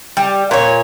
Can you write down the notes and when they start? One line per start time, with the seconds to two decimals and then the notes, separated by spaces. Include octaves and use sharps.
0.17 G3
0.51 A#2 C#5